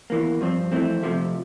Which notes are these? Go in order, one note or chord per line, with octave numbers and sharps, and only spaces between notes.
E2 E3 A#3
G2 F3 C4
F2 E3 A3 C4
F2 C3 F3 A3